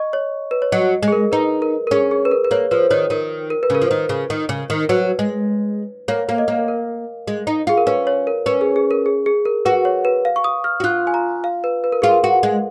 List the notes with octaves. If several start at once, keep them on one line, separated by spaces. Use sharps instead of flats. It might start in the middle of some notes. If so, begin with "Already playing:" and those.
Already playing: D#5 C#6
C#5
B4
C#5
F#3 D#5
G#3
G#4
A#4
D#4 B4
A#4
A#4
C#4 G#4
G#4
B4
A#4
B4
A#3 C#5
F3 B4
D#3 C#5
D#3 A#4
A#4
B4
C#3
A#4
F3
D#3
C#3
D#3
C#3
D#3
F#3 B4
G#3
A#3 C#5
A#3
D#5
A#3
A#4
G#3
D#4
F4 G#4
A#4
C#4 B4
C#5
A#4
C#4 B4
G#4
G#4
A#4
G#4
G#4
A#4
F#4 B4
C#5
B4
F5
C#6
D#6
F6
F#4
F4 F#6
G#5
A#5
F5
B4
B4
A#4
F4 G#4
A#4
F#4
G#3